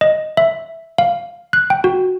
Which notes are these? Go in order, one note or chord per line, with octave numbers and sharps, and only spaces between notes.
D#5
E5
F5
F#6
G5
F#4